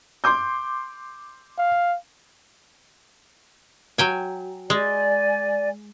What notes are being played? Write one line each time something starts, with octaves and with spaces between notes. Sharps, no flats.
C6 D6 G6
F5
F#3 G5 G#5
G#3 D5 G#5